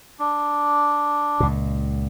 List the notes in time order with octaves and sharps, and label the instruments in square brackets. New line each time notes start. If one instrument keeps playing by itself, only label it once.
[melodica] D4
[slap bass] C#2 A#2